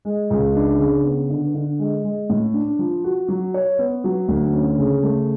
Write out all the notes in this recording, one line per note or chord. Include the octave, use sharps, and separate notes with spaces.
G#3
C#2
D4
C#3
B3
D3
D3
G#3
G#3
A2
D4
F3
F#4
F#3
C#5
B3
F#3
D2
C#4
C#3
A3